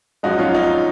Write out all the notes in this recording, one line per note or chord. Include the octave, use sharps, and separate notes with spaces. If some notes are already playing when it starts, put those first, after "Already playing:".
F#2 F3 G#3 D#4 F#4
C#4 F4
D#4